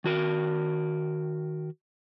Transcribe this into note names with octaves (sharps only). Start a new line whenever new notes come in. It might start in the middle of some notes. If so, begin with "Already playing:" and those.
D#3 F#4 A#4